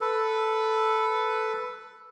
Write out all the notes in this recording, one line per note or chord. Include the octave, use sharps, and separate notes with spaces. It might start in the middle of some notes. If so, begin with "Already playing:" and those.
A4 B4